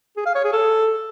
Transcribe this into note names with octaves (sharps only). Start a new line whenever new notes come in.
G#4
F5
C#5
G#4
A4